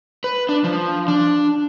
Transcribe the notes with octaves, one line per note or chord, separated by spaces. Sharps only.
B4
D4
F3
D4